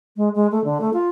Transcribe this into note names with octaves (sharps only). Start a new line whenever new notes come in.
G#3
G#3
A3
D3
A3
F4